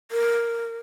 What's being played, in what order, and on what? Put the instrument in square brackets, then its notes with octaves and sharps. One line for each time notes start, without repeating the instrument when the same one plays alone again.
[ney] A#4